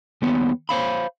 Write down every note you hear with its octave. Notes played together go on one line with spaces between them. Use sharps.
D#2 G3 B3 C#5
C5 C#5 F5 B5